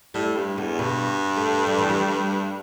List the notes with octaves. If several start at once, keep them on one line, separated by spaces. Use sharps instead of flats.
A2 G3
G2
E2 D3
G2 B2
A3
G3
E3
G3